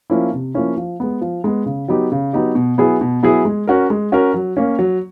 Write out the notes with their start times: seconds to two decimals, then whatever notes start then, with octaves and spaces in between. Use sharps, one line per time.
0.10 F3 A#3 C#4 E4
0.33 C3
0.54 F3 A#3 C#4 E4
0.77 F3
1.00 G#3 B3
1.21 F3
1.44 G#3 B3
1.66 C#3
1.88 F#3 B3 D#4 G4
2.12 C#3
2.33 F#3 B3 D#4 G4
2.55 B2
2.78 F#3 B3 E4 G#4
3.01 B2
3.23 F#3 B3 E4 G#4
3.45 G#3
3.67 C#4 F#4 A#4
3.90 G#3
4.12 C#4 F#4 A#4
4.34 F#3
4.57 A#3 C#4
4.79 F#3